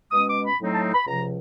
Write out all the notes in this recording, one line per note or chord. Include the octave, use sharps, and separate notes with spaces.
B2 G#3 C#4 D#6
D6
B5
A2 F#3 A3 C4 D#4
A5
B5
C#2 C3 F3 A#5